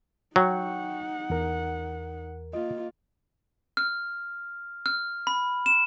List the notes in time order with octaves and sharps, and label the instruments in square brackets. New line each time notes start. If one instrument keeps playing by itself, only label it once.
[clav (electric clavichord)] F#3 [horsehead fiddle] D#4 F#5 [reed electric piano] G5 C#6
[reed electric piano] E2 A#4
[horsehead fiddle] A#3 F4 [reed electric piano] D#5
[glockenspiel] F6
F6
B5
E7